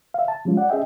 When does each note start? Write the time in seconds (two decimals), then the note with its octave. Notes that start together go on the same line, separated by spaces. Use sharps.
0.14 E5 F5
0.28 A5
0.45 F3 G3 G#3 C#4 F4
0.57 D5 F#5
0.70 C#4 G#4 D#5 E5 G5